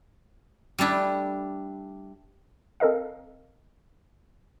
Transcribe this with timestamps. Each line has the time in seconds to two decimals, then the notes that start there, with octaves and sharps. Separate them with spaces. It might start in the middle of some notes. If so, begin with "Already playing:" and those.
0.78 G3 A3 D4 E4
2.80 C4 A4 A#4 D#5 F5